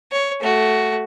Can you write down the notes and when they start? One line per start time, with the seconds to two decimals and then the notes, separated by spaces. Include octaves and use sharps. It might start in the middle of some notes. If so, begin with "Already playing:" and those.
0.12 C#5
0.41 A3 F#4